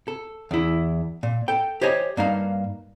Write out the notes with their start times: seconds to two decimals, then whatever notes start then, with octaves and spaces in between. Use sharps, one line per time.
0.08 A4
0.51 E2 E4
1.23 A#2
1.48 A4 G5
1.81 G4 C5 C#5 D#5 F#5 G#5
2.17 G2 A#3 D#4 F5